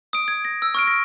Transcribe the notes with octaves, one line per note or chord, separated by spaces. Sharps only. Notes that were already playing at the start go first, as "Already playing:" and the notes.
D#6 D7
G#6
A#6
E6
C#6 F6 D7
A#6